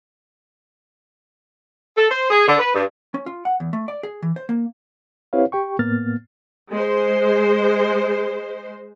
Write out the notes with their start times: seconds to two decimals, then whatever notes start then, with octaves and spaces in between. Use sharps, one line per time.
1.96 A4
2.11 C5
2.31 G#4
2.47 D3
2.59 B4
2.74 G2
3.14 C#4
3.26 F4
3.45 F#5
3.60 E2
3.73 A3
3.88 D5
4.03 G#4
4.22 E3
4.36 C5
4.49 A#3
5.33 C4 E4 G4 B4 C#5 F5
5.52 G4 G5 C#6
5.79 A2 A#3 B3 F6 A6
6.71 G#3 C5